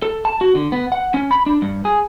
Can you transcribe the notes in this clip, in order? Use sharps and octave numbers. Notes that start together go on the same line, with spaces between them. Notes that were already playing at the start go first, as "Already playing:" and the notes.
A4
A5
F#4
D3
B3
F#5
C#4
B5
D4
G2
G#4